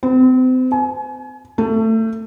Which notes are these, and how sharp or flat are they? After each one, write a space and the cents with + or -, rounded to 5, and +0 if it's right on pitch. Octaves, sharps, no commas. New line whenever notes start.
C4 -35
G#5 +30
A3 +25